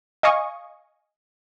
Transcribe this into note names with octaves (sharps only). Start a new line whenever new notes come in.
D#5 F5 G#5 C#6 D#6